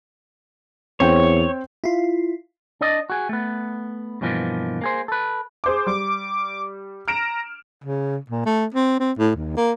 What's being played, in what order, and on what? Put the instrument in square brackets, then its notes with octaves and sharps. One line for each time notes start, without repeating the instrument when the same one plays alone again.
[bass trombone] E2 [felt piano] C4 C5 G5 [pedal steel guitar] C#5
[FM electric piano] E4 F4
[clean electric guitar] D4 D5 D#5
F#4 G#4
A3 B3
G2 B2 E3 F3 A#3
A#3 G#4 C5
A4 B4
[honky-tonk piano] G#4 C5 D6
[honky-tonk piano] G3 [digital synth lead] D6
[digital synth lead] A#5 [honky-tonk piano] F6 D7 E7
[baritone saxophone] C#3
A#2
A3
C4
C4
A2
D#2
A#3